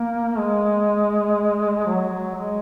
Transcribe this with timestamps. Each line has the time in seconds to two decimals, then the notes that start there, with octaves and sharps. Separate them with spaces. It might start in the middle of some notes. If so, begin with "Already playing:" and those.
Already playing: A#3
0.38 G#3
1.87 F#3
2.35 G#3